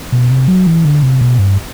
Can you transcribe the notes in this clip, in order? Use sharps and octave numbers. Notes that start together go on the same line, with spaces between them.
B2
C3
F#3
E3
D3
C3
B2
G2